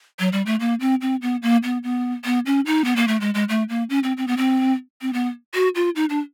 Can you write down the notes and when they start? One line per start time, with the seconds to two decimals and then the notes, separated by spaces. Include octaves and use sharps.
0.19 F#3
0.32 G3
0.46 A3
0.60 A#3
0.80 C4
1.01 C4
1.22 B3
1.42 A#3
1.63 B3
1.83 B3
2.25 B3
2.46 C#4
2.66 D#4
2.84 B3
2.96 A#3
3.07 A3
3.21 G#3
3.34 G#3
3.49 A3
3.69 A#3
3.90 C#4
4.03 C4
4.17 C4
4.27 B3
4.37 C4
5.02 C4
5.13 B3
5.54 F#4
5.75 F4
5.96 D#4
6.10 D4